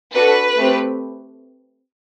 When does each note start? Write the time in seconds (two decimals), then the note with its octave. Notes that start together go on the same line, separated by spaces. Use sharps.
0.13 D4 F#4 A4 B4
0.58 A3 C4 G4